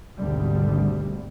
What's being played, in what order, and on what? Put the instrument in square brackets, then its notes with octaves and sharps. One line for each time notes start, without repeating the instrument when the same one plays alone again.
[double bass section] G#1 D2 B2 D3 G3